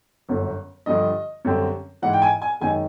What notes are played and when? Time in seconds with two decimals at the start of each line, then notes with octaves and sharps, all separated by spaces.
0.29 G1 F#2 D3
0.86 G2 D3 F3 D#5
1.45 F#2 D3 G3 C4
2.02 G#2 E3 G#3 F#5
2.13 G5
2.22 G#5
2.42 G#5
2.61 F#2 D#3 G#3 G#5